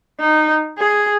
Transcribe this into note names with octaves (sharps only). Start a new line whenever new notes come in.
D#4
G#4